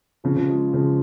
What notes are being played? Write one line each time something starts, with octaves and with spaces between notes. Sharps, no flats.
C#3 F3
C#3 F3
F3 G#3
C#3 F3